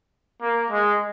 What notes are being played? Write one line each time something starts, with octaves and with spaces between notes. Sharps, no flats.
A#3
G#3